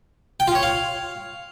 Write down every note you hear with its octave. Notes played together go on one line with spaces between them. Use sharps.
G5
F4
C#5
F5